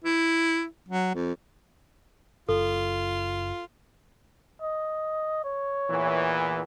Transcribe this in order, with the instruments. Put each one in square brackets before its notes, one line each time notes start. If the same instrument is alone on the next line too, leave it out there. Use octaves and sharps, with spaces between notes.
[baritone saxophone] E4
F#3
F2
[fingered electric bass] F#1 [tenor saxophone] F4 [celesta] A4
[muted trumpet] D#5
C#5
[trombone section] E2 A#2 E3